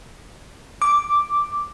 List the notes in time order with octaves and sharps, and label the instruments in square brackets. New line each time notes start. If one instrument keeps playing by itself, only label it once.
[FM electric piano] D6